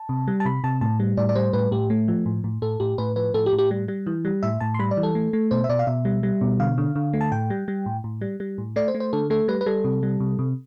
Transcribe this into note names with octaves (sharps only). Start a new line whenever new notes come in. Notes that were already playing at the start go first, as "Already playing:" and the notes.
Already playing: A5
C3
G3
A5
C3 B5
C3 A5
A2 A5
G3
A2 D5
D5
G3 C5
A2 B4
A2 G4
A3
F3
A2
A2
A2 A4
A2 G4
A2 B4
F3 B4
A2 A4
G4
A2
G4
G3
G3
E3
G3
A2 E5
A2 A5
C6
G3 B5
D5
E3
A4
A3
A3
B2 C5
E5
B2 D5
F5
B2 E5
G3
G3
B2
D3 F5
D3
D3
A3
A5
A2 G5
G3
G3
A2
A2
G3
G3
A2
A3 D5
C5
A3
C5
D3 A4
A3 A4
G3 B4
B4
G3 A4
C3
G3
C3
C3